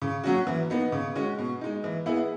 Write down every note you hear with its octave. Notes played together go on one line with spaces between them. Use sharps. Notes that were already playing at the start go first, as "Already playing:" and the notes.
C#3
F#3 C#4 F#4
E3
B3 D#4
C#3
G#3 C#4 F#4
B2
G#3 D#4
E3
B3 E4 G#4